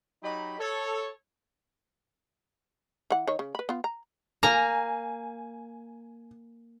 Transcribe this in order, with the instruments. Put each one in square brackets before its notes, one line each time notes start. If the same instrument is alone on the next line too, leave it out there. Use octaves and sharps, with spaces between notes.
[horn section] F#3 D#4 G4 D#5 B5
A4 C#5
[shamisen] E3 F#5
D#3 C#5
C#3
B4 B5
B3 F4
A#5
[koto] A#3 A#5 [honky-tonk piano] G#5